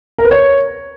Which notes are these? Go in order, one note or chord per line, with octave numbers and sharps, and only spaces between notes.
A#4
B4
C#5